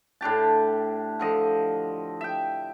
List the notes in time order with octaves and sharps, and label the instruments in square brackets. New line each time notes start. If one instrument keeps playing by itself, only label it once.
[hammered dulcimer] A2 D4 G4 A5
D3 F3 D#5
E5 G5